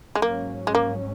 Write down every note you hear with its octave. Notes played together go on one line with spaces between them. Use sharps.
G#3
G#2 F#3 A#3 C#4
G#3
A#3